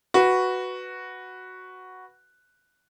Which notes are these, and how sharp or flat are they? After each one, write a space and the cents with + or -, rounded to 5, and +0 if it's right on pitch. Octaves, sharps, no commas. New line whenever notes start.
F#4 +0 B4 +0